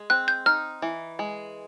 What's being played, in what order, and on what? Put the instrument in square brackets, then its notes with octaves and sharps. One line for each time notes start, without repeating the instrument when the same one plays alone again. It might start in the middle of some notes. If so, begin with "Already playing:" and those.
Already playing: [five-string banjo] G#3
[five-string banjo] C4 [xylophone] F#6
[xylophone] G6
[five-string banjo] D#4 [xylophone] F6
[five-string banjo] E3
G#3